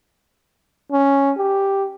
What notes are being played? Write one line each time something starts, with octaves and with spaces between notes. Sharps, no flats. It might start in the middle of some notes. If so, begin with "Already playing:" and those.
C#4
G4